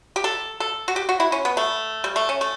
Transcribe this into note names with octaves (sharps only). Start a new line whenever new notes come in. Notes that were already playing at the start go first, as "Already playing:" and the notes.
G4
A4
A4
F#4
G4
F#4
E4
C#4
B3
A3
G3
A3
C#4
A3